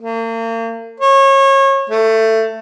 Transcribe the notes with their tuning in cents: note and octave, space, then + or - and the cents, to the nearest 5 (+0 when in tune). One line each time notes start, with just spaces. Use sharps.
A#3 -40
C#5 -30
A3 +15